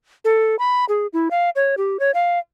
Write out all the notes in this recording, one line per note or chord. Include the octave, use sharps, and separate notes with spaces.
A4
B5
G#4
E4
F5
C#5
G4
C#5
F5